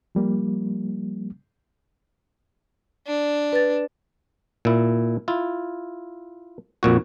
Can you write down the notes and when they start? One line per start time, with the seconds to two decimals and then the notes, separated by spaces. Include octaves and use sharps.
0.15 F3 G3 A#3
3.07 D4
3.53 B4 A6
4.65 A#2 E4
5.28 E4 F4
6.83 F2 A#2 F#4